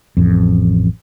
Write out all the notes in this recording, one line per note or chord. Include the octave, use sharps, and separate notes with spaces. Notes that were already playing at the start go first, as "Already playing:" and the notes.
A1 F2